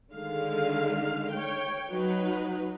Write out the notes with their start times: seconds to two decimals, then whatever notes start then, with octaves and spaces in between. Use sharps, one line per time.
0.13 D3 D#3 G#3 F5
1.32 C#5 G5
1.90 F#3 D#4 B4